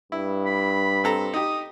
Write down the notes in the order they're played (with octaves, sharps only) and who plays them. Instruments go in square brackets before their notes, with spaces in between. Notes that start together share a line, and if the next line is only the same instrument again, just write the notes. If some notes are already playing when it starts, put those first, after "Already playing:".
[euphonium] G2 [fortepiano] E4
[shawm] B5
[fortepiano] C4 A4 A#5
[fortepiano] D#4 G4 [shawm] D#6